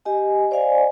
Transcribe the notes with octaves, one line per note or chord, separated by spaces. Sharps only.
G4 D#5 G#5
C5 D5 D#5 F5 G#5